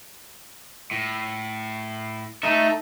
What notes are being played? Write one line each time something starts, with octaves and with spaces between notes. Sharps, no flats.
A2
A3 D#4 A4 E5